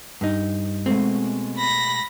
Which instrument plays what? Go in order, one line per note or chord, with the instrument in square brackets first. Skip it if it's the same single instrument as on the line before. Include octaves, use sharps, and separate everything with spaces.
[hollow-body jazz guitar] G2 D#4
[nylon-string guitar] B2 G#3 A3 [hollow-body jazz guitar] C4
[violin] B5 A#6